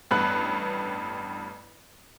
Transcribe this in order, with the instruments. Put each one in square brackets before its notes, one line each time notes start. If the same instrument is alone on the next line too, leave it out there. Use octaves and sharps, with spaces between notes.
[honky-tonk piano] A1 G2 B3 B5 F#6